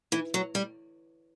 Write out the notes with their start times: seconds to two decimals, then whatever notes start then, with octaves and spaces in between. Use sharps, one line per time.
0.12 E3
0.34 F#3
0.55 G3